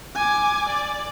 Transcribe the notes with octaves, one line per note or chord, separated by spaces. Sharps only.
G#5 D6
D5